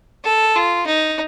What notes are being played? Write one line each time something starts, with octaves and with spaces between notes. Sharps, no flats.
A4
F4
D#4